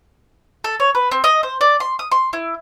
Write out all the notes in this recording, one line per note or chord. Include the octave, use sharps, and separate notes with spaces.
A4
C#5
B4
C4
D#5
C5
D5
C6
D#6
C6
E4